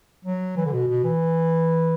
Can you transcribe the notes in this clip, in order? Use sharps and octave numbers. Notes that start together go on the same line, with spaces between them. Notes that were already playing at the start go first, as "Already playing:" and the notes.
F#3
E3
D3
B2
B2
E3